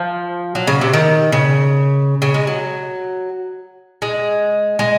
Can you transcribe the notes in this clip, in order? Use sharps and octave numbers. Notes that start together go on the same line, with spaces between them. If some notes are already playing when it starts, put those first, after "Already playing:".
Already playing: F3
F#3
C#3
C3
D#3
C#3
C#3
G#3
F#3
G#3
G#3